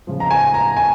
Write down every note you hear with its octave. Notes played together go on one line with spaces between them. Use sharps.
C#3 F3
A#5
G#5
A#5
G#5